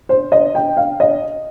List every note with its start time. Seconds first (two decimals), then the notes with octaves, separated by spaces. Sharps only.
0.09 C5
0.32 D#5
0.55 G5
0.77 F5
1.00 D#5